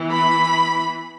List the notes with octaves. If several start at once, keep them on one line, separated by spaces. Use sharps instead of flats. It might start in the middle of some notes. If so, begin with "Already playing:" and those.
Already playing: E3 B3 E4
B5